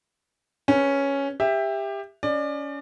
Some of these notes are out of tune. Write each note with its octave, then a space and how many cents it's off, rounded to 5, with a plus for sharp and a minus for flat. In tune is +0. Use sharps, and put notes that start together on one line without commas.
C#4 +0 G#4 +0 B4 +0
G4 +20 E5 +0
C#4 +25 D5 +30